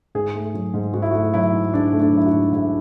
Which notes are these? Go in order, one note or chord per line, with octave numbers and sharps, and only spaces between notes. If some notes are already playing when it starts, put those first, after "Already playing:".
G#2 G#4
A3
F#3
G#2
G#2 F#4
E4
A3 F#4
F#3 E4
G#2
G#2 D4
A3
D4
F#3 E4
F#4
G#2
G#2 E4